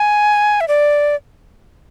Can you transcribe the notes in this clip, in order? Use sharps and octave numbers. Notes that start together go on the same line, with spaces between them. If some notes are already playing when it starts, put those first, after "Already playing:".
Already playing: G#5
E5
D5